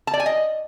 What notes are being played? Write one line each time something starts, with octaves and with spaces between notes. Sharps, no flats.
A5
D5
G#5
D#5